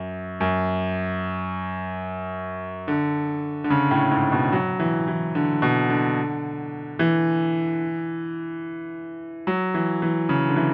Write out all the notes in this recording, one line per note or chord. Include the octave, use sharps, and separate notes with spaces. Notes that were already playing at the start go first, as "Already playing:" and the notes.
Already playing: F#2
F#2
D3
D3
C#3
A2
G#2
B2
F#3
E3
E3
D3
B2
D3
E3
F#3
E3
E3
C#3
D3
E3